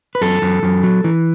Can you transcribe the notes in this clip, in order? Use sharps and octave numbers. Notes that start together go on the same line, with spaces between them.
B4
F#2 A4
F#2
F#2
F#3
E3